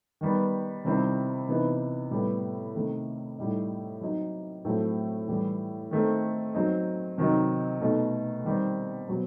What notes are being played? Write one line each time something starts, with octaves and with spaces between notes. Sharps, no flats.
D#3 G3 B3
C3 D#3 G3 C4 E4
C3 E3 B3 D#4
A2 G3 B3
C3 D#3 A3
A2 G3 D#4
F#3 C4 D#4
A2 F#3 A3 C4
A2 E3 G3
D#3 A3 C4
F#3 C4 D#4
C3 D#3 F#3 C4 D#4
B2 A3 D#4
D#3 G3 C4
B2 F#3 C4